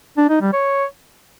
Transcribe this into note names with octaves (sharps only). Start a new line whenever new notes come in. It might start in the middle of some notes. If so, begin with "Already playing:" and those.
D4
D#4
G3
C#5